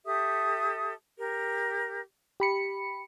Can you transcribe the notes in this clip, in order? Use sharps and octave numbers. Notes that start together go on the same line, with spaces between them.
G4 A4 E5 D#6
G4 A#4
G4 B5 C#7